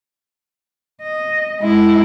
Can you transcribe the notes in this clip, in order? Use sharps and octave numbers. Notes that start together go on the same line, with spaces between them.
D#5
G#3 E4